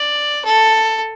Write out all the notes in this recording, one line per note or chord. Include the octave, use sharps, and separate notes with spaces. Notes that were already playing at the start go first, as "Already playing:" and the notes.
Already playing: D5
A4